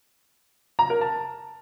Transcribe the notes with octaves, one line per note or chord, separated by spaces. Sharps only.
A#5
A#4
A5